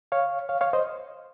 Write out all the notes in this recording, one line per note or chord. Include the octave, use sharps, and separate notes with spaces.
C#5 F5
C#5 F5
C#5 F5
C5 D#5